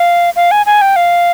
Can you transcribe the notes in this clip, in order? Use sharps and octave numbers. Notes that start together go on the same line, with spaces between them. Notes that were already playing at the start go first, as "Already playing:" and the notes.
Already playing: F5
F5
G#5
G#5
G5
F5